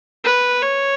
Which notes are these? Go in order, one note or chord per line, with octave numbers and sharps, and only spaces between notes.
B4
C#5